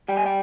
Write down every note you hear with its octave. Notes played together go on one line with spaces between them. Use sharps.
G3 G5
G#5
G5